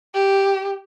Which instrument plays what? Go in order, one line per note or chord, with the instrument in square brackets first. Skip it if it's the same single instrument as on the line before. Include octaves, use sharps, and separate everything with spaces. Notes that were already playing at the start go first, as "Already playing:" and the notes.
[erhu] G4